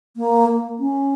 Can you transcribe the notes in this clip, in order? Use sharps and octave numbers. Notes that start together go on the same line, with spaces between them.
A#3
C#4